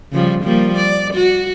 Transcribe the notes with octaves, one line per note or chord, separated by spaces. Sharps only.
C#3 F3 G3
F3 G3 A#3
D5
F#4